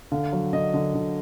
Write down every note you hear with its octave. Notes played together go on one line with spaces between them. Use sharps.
D3 F5
F#3
D3 D#5
D3
D3